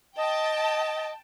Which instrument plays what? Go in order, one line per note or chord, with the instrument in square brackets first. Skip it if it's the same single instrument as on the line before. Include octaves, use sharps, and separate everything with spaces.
[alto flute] D#5 [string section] G5 A5